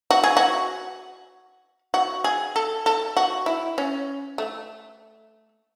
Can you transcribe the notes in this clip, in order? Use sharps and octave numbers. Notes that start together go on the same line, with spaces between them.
F#4
G#4
F#4
F#4
G#4
A4
A4
F#4
E4
C#4
A3